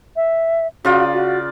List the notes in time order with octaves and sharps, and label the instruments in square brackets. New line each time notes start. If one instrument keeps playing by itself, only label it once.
[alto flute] E5
[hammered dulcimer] C#3 F4 D5 [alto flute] F#4
[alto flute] F#4